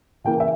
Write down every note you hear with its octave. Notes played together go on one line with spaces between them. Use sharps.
C#3 E3 A#3 G5
E5